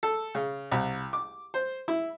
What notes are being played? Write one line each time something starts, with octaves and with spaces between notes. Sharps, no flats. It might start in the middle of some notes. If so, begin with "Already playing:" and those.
A4
C#3
C2
D6
C5
E4